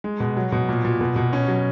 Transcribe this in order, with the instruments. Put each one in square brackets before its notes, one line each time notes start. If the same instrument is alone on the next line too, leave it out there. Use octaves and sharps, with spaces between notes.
[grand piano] G#3
B2
F#3
B2
A#2
A#2
B2
B2
C#4
F#3